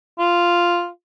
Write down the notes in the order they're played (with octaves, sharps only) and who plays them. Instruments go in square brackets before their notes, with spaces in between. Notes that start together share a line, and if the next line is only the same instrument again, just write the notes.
[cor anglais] F4